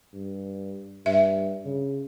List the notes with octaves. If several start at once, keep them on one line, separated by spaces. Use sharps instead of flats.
G2
G2 E5
C#3